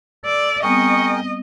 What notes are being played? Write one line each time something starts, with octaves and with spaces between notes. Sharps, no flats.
A4 D5
G3 B3 C4 G#4 A#4 D#5 G5 C#6